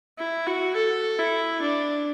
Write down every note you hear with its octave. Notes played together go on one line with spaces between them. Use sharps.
E4
F#4
A4
E4
D4